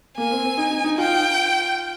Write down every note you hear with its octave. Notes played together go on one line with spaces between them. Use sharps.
A#3 G#5
C4
C4
D#4
D#4
D#4
F4 G5